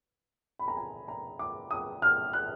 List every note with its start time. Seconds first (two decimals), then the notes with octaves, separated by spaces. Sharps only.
0.59 B5
0.68 A#5
0.77 G#5
1.08 A#5
1.39 D6
1.71 D#6
2.02 F6
2.33 F#6